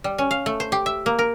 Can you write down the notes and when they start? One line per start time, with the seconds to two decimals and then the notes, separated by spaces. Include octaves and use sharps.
0.04 G3
0.18 C#4
0.31 F5
0.46 A3
0.60 C5
0.72 G4
0.86 E5
1.06 A#3
1.19 A#4